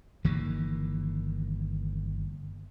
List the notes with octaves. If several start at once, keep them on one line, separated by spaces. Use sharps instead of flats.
G1 D#3 E3 A#3